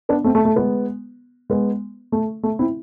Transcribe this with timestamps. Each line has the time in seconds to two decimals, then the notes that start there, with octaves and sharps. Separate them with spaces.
0.09 B3 D4
0.24 A3 C4
0.35 A3
0.45 A3
0.56 G#3 B3
1.50 G#3 B3
2.12 A3
2.43 A3
2.59 C4 E4